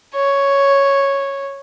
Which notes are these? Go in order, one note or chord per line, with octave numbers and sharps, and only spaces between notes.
C#5